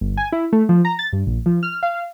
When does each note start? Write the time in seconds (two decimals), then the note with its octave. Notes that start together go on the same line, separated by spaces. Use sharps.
0.01 G1
0.17 G#5
0.32 E4
0.53 A3
0.69 F3
0.85 A#5
0.99 A6
1.13 G2
1.27 A#1
1.46 F3
1.63 F6
1.83 F5